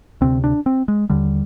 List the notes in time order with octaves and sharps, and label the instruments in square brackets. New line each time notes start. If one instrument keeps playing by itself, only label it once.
[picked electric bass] D2 C3 C4
D4
C4
G#3
D#2 D3 G3